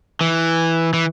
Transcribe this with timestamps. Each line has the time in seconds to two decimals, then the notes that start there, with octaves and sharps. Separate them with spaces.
0.21 E3
0.94 E3